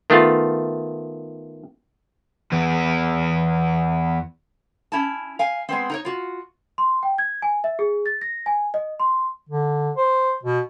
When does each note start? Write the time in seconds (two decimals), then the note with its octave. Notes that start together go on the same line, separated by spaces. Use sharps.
0.10 D#3 A3 B3 F4
2.52 E2 B3
4.92 C#4 E4 A5
5.39 F5 G#5
5.69 G#3 B3 C4
5.90 D#4 A#4 C#5
6.05 F4 F#4
6.78 C6
7.03 G5
7.18 G#6
7.42 G#5
7.64 E5
7.79 G#4
8.06 A6
8.22 A#6
8.46 G#5
8.74 D#5
9.00 C6
9.49 D3
9.97 C5
10.43 B2